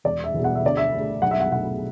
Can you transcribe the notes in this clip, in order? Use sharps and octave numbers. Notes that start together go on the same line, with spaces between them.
E1 D5
E5
E2 B2
F#5
E5
D2 D5
E5
D3 A3
B1 F#5
E5
F#5
B2 A3 F#5